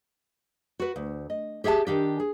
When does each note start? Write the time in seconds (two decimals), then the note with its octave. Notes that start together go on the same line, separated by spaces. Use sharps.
0.80 F#4 B4
0.96 D2
1.30 D#5
1.64 G4 G#4 E5 F#5 A5
1.87 D#3 D4 G4
2.20 G#4